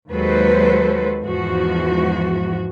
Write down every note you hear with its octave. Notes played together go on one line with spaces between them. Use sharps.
D#2 F#3 G#3 A4 B4 C5
E2 G#2 F3 F#4